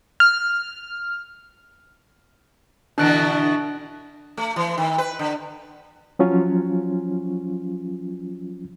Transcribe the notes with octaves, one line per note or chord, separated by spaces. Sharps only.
F6
B2 D3 E3 D4 F#6 D7
A3
E3
D#3
B4
D3
F3 F#3 C#4 F4